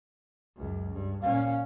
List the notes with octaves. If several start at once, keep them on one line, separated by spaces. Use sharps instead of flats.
C#2 F#2
G2
A#2 C#4 F5